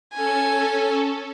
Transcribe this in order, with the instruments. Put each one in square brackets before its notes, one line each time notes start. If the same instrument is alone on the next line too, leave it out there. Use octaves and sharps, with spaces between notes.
[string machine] C#4 A4 [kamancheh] G#5